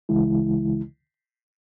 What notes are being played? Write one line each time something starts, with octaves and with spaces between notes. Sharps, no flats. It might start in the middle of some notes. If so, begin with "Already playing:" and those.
C#2 C#3 E3 G#3 E4